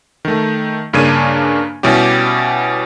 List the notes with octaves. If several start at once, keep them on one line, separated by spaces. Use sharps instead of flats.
D#3 A3
G2 C#3 A#3 D4 G#6 D#7
B2 G3 C#4 E4 G4